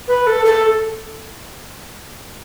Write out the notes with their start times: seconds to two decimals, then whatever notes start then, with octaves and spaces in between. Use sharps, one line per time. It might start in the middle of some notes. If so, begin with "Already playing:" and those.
0.08 B4
0.27 A4
0.45 A4